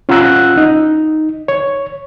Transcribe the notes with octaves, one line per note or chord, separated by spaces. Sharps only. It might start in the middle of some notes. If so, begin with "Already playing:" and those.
C#4 F4 F#5 A#5 E6 F#6
D#4
C#5